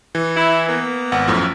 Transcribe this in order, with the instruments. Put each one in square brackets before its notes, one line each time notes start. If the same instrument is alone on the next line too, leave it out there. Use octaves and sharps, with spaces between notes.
[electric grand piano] E3
[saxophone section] E4
A#3 B3
[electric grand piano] G#1 F#5
F#2 A2 F3